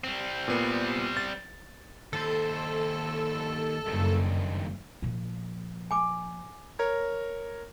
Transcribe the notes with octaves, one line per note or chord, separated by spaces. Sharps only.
G3 C4
A#2 B3
A6
D#2 A4 C5
F#1 G2 D#3
A#2 F3
G#5 D6
A#4 C#5 A#5 G#6